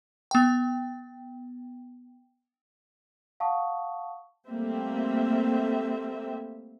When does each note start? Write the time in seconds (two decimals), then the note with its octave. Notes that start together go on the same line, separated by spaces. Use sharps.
0.31 B3 G5
3.40 F5 F#5 A5 C#6 D#6
4.48 G3 A3 A#3 C4 E5